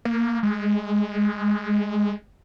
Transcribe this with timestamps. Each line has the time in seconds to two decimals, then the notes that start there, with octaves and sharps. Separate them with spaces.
0.05 A#3
0.43 G#3